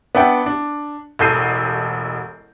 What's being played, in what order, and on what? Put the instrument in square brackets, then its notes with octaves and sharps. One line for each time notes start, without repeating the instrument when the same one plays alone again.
[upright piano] B3 D4 E5 F#5 G5
D4
E1 A1 A4 G6 C7 D#7